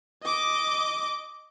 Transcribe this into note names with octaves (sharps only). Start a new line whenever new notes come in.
D#5 D6